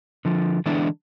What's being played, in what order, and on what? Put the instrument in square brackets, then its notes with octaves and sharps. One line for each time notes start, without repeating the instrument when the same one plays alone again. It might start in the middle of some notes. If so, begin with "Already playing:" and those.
[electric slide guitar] D3 F3
D3 E3 G#3 B3 D4 E4